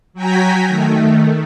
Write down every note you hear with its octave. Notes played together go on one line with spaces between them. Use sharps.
F#3 F#4 G5 G#5 A#5 B6
D#3 A3